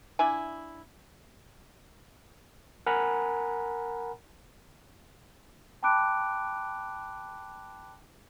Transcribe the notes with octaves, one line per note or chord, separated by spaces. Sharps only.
D4 E4 G#5
A#4 F#5 G#5 A#5 B5
G5 A5 B5 D6 F#6 D7